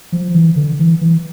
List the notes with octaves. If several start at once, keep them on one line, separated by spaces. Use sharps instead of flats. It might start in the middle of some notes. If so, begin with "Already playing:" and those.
F3
E3
D3
E3
E3